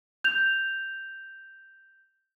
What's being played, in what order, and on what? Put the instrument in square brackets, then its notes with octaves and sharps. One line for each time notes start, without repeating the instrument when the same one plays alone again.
[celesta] G6 F7